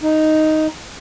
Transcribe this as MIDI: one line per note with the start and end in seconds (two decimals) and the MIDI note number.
0.01 0.67 63